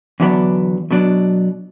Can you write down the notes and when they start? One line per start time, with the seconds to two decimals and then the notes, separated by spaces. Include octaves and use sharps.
0.20 E2 D3 F#3 B3 D4
0.91 B2 F#3 D4